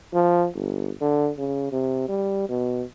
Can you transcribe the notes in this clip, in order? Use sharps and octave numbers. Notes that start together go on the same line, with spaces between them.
F3
G1
D3
C#3
C3
G3
B2